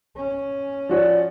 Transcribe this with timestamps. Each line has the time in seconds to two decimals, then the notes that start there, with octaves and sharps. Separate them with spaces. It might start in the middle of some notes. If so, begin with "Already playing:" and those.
0.16 C#4
0.89 F3 F#4 C#5 D5